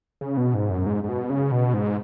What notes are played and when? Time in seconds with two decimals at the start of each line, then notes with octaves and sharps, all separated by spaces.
0.21 C#3
0.37 B2
0.54 G#2
0.70 F#2
0.86 G#2
1.04 G#2
1.09 B2
1.30 C#3
1.52 B2
1.74 G#2